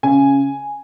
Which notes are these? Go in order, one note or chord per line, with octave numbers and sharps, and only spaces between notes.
C#3 G#5